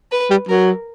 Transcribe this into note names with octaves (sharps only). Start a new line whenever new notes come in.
B4
G3
F#3 A#4